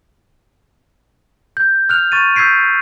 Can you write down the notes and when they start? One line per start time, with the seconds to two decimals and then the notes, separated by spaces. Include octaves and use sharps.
1.57 G6
1.89 F6 F#6 F7
2.12 C#6 A6 D#7
2.35 E6 G6 G#6 B6 C7 D7